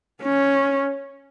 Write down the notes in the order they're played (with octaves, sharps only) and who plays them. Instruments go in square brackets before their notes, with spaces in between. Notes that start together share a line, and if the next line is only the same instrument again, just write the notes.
[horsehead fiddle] C#4